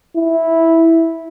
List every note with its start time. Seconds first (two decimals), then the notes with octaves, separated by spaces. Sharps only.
0.17 E4